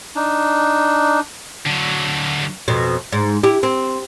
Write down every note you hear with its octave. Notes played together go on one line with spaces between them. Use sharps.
D4 D#4
D3 F#3
F2 B2
G#2
E4 G4
C4